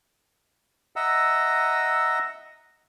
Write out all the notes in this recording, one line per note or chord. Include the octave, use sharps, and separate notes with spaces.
D#5 E5 F#5 A#5 E6